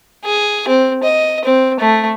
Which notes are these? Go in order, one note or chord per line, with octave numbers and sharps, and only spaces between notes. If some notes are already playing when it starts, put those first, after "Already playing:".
G#4
C4
D#5
C4
A3